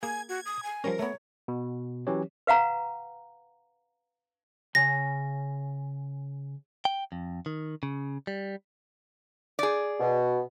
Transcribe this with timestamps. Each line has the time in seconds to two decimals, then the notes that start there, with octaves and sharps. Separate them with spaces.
0.03 A#3 G#4 G#5 G#6
0.29 F#4 G#6
0.46 D#6
0.63 G#5
0.84 F3 G3 C#4 A#4
0.99 A3 B3 C#5
1.48 B2
2.07 E3 F#3 C#4 G4 C#5
2.47 B4 F5 F#5 A#5
4.75 C#3 G#5 A#6
6.85 G5
7.12 F2
7.46 D#3
7.83 C#3
8.27 G3
9.59 G#4 D5
10.00 B2